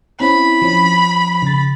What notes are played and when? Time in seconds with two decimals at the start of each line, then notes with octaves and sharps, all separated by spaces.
0.20 C4 C#4 E4 B5
0.62 F3 C#4
1.42 C#3 A6